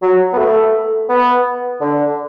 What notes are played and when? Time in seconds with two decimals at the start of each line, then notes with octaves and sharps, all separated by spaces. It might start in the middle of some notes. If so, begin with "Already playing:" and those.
0.02 F#3
0.33 B3
0.38 A3
1.09 B3
1.81 D3